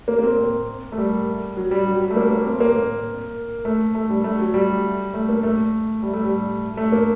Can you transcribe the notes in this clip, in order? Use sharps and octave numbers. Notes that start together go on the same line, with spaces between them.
A#3
A#3
C4
A#3
A3
G3
F#3
G3
F#3
G3
A3
A#3
A#3
C4
A#3
A#3
A3
A3
G3
A3
F#3
G3
A3
A#3
A3
G3
A3
G3
A3
A#3